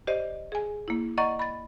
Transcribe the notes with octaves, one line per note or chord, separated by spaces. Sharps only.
G4 C5 D5 D#5
G#4 G#5
A#3 E4
D5 D#5 F#5 A#5 C#6 A6
B5 A6